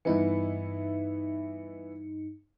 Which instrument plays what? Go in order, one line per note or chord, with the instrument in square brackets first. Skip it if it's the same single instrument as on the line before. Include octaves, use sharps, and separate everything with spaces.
[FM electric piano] G2 D#4 C#7 [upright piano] E3 B3 E4